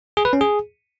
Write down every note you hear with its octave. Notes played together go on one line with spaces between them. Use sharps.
G#4
B4
C#4
G#4